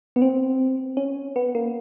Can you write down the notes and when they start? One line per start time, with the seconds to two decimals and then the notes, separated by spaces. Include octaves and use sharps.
0.16 B3
0.22 C4
0.97 C#4
1.36 B3
1.55 A#3